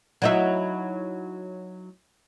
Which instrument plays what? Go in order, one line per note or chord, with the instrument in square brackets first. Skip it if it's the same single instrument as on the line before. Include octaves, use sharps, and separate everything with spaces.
[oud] F#3 D#4 E4